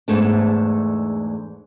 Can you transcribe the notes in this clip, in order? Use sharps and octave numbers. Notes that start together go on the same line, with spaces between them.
E2 G#2 A3 D4